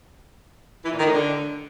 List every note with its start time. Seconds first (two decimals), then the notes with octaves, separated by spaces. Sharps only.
0.85 E3
0.92 A#2
0.99 D#3
1.06 A2
1.12 D3